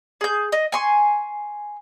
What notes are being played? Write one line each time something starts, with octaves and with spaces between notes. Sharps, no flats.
G#4 G6
D#5
G#5 C6 C#6